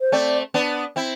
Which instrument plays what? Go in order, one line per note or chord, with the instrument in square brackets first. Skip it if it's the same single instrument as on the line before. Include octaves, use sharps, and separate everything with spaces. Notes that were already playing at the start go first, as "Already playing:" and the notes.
[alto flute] C5
[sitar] A3 C4 [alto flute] D5
[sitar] B3 D4
C4 E4